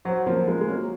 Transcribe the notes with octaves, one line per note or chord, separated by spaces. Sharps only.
F#3 C5
F3 A#3
G#3 F4
G#3
F#3 A#3